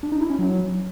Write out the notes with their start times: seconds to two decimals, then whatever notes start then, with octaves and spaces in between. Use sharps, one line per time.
0.03 D4
0.12 D#4
0.21 E4
0.30 C#4
0.39 F#3